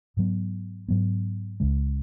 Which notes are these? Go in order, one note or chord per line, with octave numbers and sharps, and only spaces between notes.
G#2 F#3 B3
G#2 F#3 B3
C#2 C#3 G#3